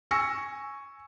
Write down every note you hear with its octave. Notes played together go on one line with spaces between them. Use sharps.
G#5 C#6 E6 A#6 C#7